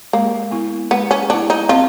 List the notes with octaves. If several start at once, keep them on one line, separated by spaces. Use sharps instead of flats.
G#3 A#3
B3 E4
G#3 B3
C#4
B3 D4 E4
D#4
C4 F4